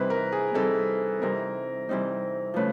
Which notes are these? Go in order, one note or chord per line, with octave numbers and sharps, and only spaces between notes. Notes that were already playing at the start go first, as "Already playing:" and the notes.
Already playing: C3 E3 G3 C4 D#4 B4
A#4
G#4
C3 E3 G3 C4 D#4 A4
C3 E3 G3 C4 D#4 A#4
C3 E3 G3 C4 D#4
C#3 F3 A3 B4